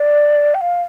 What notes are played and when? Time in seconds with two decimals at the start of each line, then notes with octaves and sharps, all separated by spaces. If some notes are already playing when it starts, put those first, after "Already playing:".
Already playing: D5
0.54 G5
0.61 F5